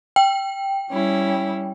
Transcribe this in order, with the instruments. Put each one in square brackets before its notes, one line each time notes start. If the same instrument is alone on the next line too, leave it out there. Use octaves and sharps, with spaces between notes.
[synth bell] G5
[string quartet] G3 C#4 E4